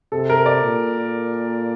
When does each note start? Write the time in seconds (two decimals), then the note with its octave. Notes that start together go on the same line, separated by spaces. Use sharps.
0.12 C3 A4
0.30 A#4
0.46 D5
0.63 A#2